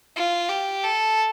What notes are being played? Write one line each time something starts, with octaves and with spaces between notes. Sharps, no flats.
F4
G4
A4